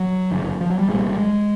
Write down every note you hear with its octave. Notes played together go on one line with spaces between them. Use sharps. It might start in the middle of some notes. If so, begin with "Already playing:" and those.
Already playing: F#3
G1 F#2 C#3
F3
F#3
G3
C2 A#2 G#3
G3
G3
G#3